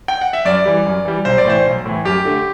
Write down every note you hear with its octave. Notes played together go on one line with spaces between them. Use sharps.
G5
F#5
E5
F#2 D5
E3 G3
F#2
E3 G3
B1 C5
D5
A2 E3 C5
B1
A2 E3
F#2 G4
D3 A3